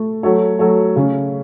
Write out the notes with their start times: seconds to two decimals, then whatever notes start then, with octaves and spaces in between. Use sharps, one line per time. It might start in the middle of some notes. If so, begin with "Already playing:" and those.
Already playing: A3
0.23 F#3 A3 F#4 A4 C#5
0.59 F#3 A3 F#4 A4 C#5
0.96 C#3 A3 C#4